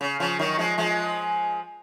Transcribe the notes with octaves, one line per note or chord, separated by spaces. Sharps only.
C#3
C#3 F3
D#3 F#3
F3 G#3
F3 G#3